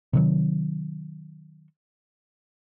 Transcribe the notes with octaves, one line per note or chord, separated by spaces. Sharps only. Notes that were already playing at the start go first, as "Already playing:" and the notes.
C3 D#3 F#3